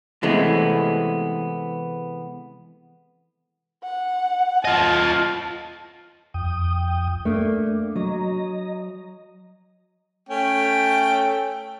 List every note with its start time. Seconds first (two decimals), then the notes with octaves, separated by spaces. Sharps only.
0.23 C3 E3 G#3 A3 B3
3.83 F#5
4.65 F4 D#5 A5
6.34 F2 G5 D#6
7.25 A3 A#3 D4
7.96 F#3 D#5 A#5
10.29 A3 C#4 G5